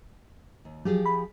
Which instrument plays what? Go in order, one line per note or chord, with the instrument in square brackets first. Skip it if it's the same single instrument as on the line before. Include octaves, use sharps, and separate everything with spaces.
[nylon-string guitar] D#2
[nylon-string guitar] F3 G4 G#4 [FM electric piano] F#3
[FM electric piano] B5